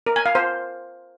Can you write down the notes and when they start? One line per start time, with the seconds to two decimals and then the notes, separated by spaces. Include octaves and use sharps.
0.07 A#4
0.16 G#5
0.26 F5
0.35 C5